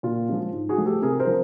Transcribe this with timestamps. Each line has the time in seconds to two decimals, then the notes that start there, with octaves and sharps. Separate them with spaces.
0.03 A#2 F4
0.28 F3 G#3 C#4
0.52 G#2
0.69 F#4 G#4
0.78 F3 A3
0.86 G4 A4
1.02 C3 G#4 A#4
1.19 A#4 C5
1.27 F3